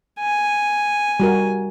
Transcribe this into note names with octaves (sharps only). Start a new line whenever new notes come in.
G#5
G3 F#4 A#4